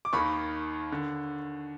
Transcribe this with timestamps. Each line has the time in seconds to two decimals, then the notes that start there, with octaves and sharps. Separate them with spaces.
0.05 D6
0.13 D#2 D#3 B5 C#6
0.92 D3